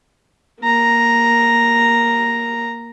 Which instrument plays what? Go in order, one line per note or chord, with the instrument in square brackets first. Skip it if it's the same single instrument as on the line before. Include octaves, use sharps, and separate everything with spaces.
[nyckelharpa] A#3 A#5